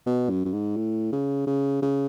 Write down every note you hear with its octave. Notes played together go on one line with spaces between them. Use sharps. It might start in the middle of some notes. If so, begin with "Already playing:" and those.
B2
F#2
F#2
G#2
A2
C#3
C#3
C#3